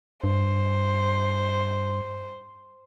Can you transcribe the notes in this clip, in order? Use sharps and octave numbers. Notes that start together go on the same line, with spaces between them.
G2 C5